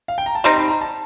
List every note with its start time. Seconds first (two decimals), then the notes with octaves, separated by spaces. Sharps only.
0.08 F5
0.18 G5
0.26 A#5
0.35 A5
0.44 G3 C4 D#4 A#5
0.57 B5
0.68 A#5
0.81 A5